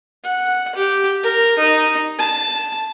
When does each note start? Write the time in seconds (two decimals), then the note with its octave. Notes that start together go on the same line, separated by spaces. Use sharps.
0.24 F#5
0.75 G4
1.23 A#4
1.59 D#4
2.19 A5